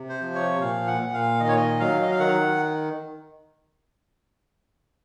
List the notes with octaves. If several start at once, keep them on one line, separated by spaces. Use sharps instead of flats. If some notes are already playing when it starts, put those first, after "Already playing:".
Already playing: C3
C5
F3
C#5
A#2 F5
F#5
A#2
F5
D#3 D#5
C#5
D#5
F#3 F5
D#5
F5
D#3 F#5